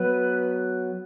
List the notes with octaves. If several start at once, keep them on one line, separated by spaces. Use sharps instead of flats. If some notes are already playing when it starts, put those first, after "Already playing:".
Already playing: F#3 B3 B4